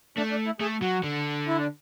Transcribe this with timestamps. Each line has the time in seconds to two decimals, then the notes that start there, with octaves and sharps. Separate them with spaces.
0.17 A3 D4
0.31 D4
0.46 E4
0.60 A3 G#4
0.81 F#3 F#4
1.03 D3
1.47 E4
1.58 D4